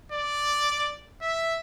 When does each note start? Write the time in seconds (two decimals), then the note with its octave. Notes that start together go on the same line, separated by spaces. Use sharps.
0.12 D5
1.22 E5